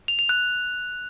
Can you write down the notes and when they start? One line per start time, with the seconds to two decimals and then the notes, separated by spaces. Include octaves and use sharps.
0.08 F7
0.19 F7
0.29 F#6